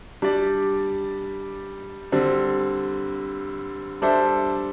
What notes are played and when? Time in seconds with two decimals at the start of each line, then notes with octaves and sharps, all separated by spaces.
0.22 G3 D4 G4 D5
2.12 D3 G3 C4
4.02 G3 D4 A4 C5 E5